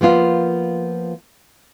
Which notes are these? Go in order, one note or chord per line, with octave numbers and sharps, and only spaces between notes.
F3 A#3 B3 F4